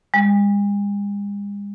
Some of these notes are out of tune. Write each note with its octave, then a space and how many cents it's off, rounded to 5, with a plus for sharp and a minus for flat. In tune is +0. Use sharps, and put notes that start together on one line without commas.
G#3 -45